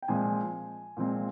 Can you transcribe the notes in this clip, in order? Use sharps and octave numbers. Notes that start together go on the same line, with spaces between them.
G5
A#2 F3 G#3 C4 G#5
A#2 F3 G#3 C4